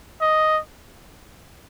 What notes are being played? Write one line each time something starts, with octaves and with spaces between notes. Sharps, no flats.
D#5